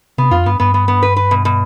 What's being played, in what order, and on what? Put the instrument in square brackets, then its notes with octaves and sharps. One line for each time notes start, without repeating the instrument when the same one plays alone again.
[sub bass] C3 [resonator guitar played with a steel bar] B3
[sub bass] F2 [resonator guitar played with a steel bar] F4
[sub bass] G2 [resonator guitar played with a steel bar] B3
[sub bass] G2 [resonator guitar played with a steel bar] B3
[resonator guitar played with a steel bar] B3
B3
B4
B4
B2
B2